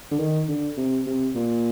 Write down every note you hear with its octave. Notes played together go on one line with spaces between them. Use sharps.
D3
D#3
D3
C3
C3
A#2